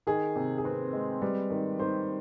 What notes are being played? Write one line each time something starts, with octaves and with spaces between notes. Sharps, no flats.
D#3 G#4
C3
G#4
C4 B4
G#3
G3 B4
D#3
D#3 C5